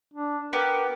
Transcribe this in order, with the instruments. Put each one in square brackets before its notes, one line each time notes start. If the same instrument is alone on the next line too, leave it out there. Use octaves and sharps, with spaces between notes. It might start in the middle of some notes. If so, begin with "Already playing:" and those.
[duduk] D4
[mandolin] B3 G4 [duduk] A#4